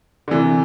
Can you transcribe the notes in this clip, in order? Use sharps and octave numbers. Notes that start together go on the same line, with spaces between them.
D3
C3 E3